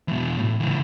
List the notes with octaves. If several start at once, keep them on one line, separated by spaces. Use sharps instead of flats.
E2 B2
A2
C#2 E3